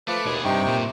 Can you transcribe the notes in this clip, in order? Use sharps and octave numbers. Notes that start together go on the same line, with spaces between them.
F3 A3 B4 D6
D#2 B2 G#4
G2 C3 D#4 G5 C#6
A#2